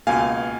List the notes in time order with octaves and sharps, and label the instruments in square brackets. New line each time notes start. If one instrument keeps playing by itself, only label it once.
[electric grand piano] C#2 B2 A#3 F5 G#5